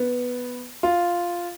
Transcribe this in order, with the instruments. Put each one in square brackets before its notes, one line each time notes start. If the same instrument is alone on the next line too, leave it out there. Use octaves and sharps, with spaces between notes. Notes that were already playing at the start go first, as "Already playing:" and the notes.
Already playing: [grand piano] B3
F4